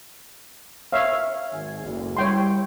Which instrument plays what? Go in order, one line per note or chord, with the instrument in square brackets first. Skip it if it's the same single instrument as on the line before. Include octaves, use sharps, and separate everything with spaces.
[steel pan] C#5 E5 F5
[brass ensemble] G#1 G#5
F#1 D2
[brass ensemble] G3 E4 [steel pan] C#5 G5 C6